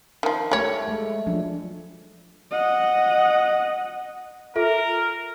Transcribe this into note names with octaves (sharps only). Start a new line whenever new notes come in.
D#3 F3
G3 A3 A4 C#5
G#3 A3
F3 F#3 D4
D#5 F#5
F4 A4 A#4 E5